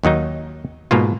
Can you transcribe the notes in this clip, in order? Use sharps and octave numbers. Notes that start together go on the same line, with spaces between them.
D#2 D#3 F#3 D#4
G#2 B2 A#3 F4